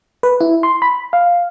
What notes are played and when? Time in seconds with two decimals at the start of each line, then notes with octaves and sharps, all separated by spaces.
0.23 B4
0.41 E4
0.63 C6
0.82 B5
1.13 F5